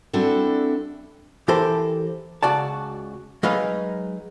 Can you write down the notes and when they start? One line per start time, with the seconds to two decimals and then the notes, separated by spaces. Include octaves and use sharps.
0.13 G3 C4 D4 E4 F#4 A4
1.48 E3 G4 A4 A#4 C5
2.43 C#2 F#4 D5 A5
3.43 F#3 G#3 D#4 B4 F5